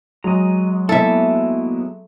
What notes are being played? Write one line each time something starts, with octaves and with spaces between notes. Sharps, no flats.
F#3 G#3 D#5 A#5
A#3 B3 E4 A4 E5